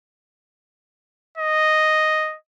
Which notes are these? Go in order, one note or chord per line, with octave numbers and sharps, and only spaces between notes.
D#5